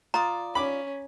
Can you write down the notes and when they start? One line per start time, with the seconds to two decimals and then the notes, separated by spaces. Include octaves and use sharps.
0.14 F4 D5 A#5 D#6
0.55 C#4 B5 D6